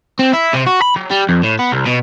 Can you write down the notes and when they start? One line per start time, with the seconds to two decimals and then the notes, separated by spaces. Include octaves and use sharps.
0.19 C4
0.34 E4
0.54 C3
0.67 F#4
0.82 B5
0.96 F#3
1.11 G3
1.29 F2
1.44 A2
1.59 B3
1.72 C2
1.86 B2